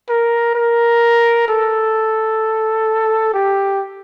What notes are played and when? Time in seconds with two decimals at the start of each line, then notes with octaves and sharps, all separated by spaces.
0.09 A#4
0.55 A#4
1.48 A4
3.33 G4